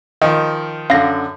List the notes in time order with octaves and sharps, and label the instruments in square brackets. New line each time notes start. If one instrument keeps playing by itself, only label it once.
[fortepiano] D#3 F3 [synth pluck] D#5
[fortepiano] F#2 D3 [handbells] F5 A#6